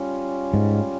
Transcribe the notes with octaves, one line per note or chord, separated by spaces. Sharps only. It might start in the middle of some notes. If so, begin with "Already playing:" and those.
Already playing: G3 C#4 F4
G#2